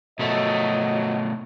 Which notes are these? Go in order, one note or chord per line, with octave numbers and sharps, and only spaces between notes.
B2 F3 F#3 A3 D#5